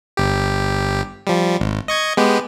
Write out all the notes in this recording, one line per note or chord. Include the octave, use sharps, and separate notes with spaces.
G1 G4
F3 G3
G#1
D#5 C#6 G#6
G#3 B3 G4